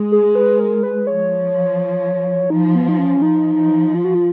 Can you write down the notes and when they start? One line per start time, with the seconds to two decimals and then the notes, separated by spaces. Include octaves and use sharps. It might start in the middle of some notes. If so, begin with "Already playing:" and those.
Already playing: G#3
0.12 G#4
0.35 B4
0.60 A#4
0.83 B4
1.07 F3 C#5
2.50 F3 D#4
2.75 B3
2.89 D#4
2.99 C#4
3.22 F3 D#4
3.95 F4
4.04 F#4
4.15 F4